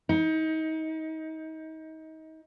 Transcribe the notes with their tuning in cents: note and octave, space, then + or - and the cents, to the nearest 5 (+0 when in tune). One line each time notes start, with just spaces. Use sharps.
D#4 +30